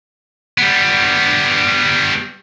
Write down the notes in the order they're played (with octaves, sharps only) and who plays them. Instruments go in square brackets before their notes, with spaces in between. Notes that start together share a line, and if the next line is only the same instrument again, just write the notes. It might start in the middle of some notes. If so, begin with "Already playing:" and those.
[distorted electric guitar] G3 B3